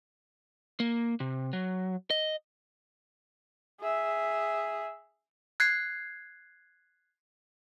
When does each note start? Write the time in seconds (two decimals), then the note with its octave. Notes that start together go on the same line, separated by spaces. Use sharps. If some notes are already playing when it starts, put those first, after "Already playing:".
0.80 A#3
1.20 C3
1.53 F#3
2.10 D#5
3.80 G#4 E5
5.60 F#6 G#6 C7